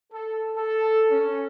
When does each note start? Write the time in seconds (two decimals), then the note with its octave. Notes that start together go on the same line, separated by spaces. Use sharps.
0.12 A4
0.56 A4
1.11 C#4